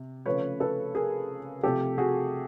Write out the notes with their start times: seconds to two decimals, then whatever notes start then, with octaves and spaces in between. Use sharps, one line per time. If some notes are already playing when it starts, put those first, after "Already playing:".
Already playing: C3
0.26 C#3 F3 A3 B4 C#5
0.60 A4 B4
0.95 G#4 A#4
1.63 C3 F3 A3 G4 A4
1.98 F#4 G#4